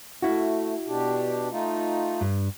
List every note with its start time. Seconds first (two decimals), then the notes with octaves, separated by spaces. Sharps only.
0.22 A3 E4 F#4
0.87 B2 D4 G4
1.51 A3 D#4 F4
2.21 G2